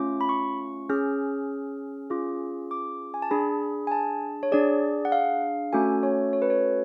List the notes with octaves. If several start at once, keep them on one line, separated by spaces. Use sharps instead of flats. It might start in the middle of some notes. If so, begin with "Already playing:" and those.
Already playing: A3 C#4 F4 D6
B5
C#6
C#4 G#4 F6
C#4 F4 G#4 D6
D6
G#5
A5
D4 G#4 B5
G#5
A5
C#5
D4 G#4 D5
F#5
F5
A3 C#4 F#4 A4 G#5
C#5
C#5
B4
C#5